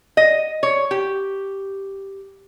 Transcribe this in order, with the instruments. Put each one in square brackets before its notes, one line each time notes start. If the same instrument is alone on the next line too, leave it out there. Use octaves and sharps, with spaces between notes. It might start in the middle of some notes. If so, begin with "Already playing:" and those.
[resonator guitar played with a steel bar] D#5
C#5
G4